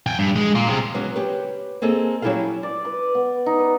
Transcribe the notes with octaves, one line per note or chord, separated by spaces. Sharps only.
G5 G#5
G2
G#3
A#3 F4
C3 G#3
C#3 F#3 G#3 B3 C#4
G4 B4 C#5
A#3 C4 G#4 A4 D#5
F#3 C#4 E4 G4 A4 F5
D5
B4
B3
D#4
B4